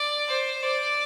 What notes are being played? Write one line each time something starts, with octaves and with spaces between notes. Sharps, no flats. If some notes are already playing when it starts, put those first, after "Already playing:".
Already playing: D5
C5
D5